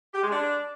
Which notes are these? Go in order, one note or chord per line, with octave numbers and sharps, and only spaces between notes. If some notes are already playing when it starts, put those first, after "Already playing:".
G4
G#3
D4